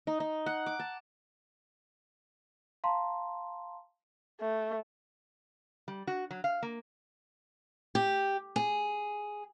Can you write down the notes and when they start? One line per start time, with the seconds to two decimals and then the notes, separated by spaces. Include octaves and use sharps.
0.07 D#4
0.20 D#4
0.46 F#5
0.66 D6
0.80 A5
2.84 F5 A5 A#5 C6
4.41 A3
5.88 G3
6.07 F#4
6.31 F#3
6.44 F5
6.63 A#3
7.95 G4
8.56 G#4